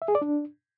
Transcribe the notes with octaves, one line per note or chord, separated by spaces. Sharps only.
E5
G#4
D5
D4